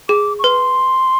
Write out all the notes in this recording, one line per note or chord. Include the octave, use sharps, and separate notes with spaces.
G#4 D6
C#6
B4 C6